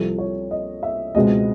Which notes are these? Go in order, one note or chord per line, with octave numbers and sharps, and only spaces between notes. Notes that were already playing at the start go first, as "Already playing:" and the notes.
Already playing: C2 C3 F3 A4
C#5
D#5
E5
C#2 B2 G#3 C4 D#5